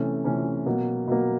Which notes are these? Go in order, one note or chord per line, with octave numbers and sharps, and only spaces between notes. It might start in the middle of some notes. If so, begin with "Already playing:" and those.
Already playing: C3 E3 A3 C#4
C3 E3 A3 C#4
B2 F#3 A#3
B2 F#3 A#3